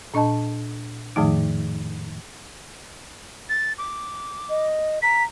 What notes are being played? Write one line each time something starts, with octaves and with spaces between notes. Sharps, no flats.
A#2 D4 D#5 A5
F2 A2 D#3 F3 A3 D#4
A6
D6
D#5
A#5 B6